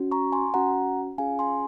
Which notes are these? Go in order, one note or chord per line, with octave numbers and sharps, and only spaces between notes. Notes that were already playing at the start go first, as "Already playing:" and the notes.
Already playing: C#4 F#4
A#5 C#6
G#5 C6
C#4 F#4 F#5 A#5
C#4 F4 G#4 F5 G#5
G#5 C6